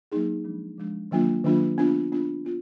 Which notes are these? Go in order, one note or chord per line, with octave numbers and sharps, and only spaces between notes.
F#3 A#3 D#4 G#4
F3 G#3 D4
F3 G#3 D4
D#3 F#3 A#3 D4 F4
D#3 F#3 A#3 D4 F4
B3 D4 F4
B3 D4 F4
B3 F4